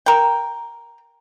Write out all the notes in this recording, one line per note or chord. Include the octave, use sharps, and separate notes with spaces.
A#4 G5